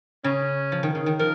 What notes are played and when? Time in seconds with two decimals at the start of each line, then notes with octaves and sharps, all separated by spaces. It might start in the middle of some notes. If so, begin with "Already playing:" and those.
0.24 C#3 C#4
0.72 F3
0.83 D#3
0.95 C#3
1.06 D#3
1.19 F3 A#4